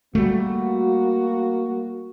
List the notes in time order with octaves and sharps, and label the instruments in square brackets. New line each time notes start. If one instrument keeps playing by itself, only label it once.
[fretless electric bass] G3 A3 [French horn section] A#3 F#4